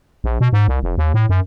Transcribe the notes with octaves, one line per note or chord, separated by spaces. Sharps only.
A#1
B2
G#2
C2
F1
D#2
A2
F#2